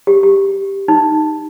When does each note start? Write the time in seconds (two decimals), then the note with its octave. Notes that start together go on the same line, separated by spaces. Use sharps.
0.07 G4
0.23 G4
0.88 D#4